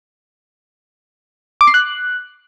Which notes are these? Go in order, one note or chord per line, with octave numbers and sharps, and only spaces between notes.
D6
C7
F#6